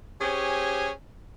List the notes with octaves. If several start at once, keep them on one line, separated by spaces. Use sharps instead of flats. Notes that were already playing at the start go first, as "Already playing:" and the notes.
C#4 G4 G#4 C5 C#5 G#5